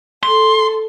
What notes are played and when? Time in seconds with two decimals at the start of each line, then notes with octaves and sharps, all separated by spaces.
0.23 A4 C6